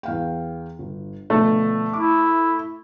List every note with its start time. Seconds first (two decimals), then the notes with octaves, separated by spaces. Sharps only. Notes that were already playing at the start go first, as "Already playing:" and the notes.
0.03 E2 F5 G5
0.79 G1
1.30 B2 D3 F3 A3
1.93 E4 D6